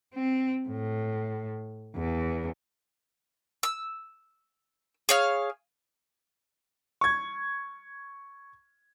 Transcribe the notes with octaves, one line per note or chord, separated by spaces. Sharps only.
C4
A2
E2
E6
G#4 C#5 F5
C#6 G#6